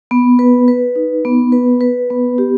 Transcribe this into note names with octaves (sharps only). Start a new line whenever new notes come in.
B3
B4
B4
D#4
B3
B4
B4
B3
G4